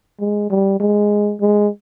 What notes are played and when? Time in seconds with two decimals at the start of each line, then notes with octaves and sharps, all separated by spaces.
0.20 G#3
0.50 G3
0.80 G#3
1.41 G#3